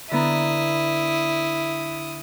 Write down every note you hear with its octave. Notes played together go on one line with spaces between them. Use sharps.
D3 B3 E4 A#5 D#6